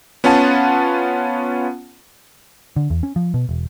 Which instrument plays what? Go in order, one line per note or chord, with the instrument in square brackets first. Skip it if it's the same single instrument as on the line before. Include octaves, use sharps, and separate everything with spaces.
[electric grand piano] B3 C#4 F4 F#5 A5
[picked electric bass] D3
E2
C#4
F3
B2
E1